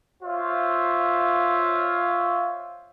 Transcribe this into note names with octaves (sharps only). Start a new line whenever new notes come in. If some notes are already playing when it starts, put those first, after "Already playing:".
F4 C5 C#5 E5 F5